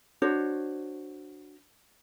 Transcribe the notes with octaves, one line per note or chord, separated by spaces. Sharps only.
D4 F#4 C5 C#5